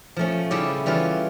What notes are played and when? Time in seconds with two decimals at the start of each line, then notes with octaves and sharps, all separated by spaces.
0.17 F3 A3 C#4
0.51 C#3 G3 C#4 E4 G4
0.86 E3 G3 C#4 F4